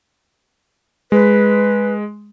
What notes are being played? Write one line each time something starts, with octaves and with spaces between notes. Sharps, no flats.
G#3 B4